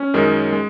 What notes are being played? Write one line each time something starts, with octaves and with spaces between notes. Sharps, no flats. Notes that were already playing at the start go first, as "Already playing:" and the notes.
Already playing: C#4
F#2 D#3 G#3
G#3